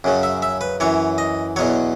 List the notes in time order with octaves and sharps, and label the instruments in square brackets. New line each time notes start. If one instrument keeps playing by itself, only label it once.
[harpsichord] F#2 C#3 F#3
E5
E5
B4
F#2 E3 C#5
D#5
E2 B2 F#3 C#5